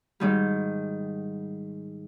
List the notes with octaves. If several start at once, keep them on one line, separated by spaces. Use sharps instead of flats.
G#2 D#3 G3